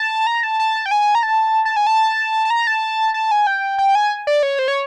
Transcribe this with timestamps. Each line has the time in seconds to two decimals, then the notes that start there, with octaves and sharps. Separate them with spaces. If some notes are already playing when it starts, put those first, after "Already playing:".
Already playing: A5
0.27 A#5
0.43 A5
0.60 A5
0.86 G5
0.91 G#5
1.15 A#5
1.23 A5
1.65 A5
1.76 G#5
1.87 A5
2.45 A5
2.50 A#5
2.67 A5
3.14 A5
3.31 G#5
3.47 G5
3.79 G5
3.95 G#5
4.27 D5
4.43 C#5
4.59 C5
4.68 C#5